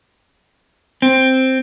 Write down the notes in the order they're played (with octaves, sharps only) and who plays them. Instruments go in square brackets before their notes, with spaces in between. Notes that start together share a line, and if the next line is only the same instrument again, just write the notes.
[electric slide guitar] C4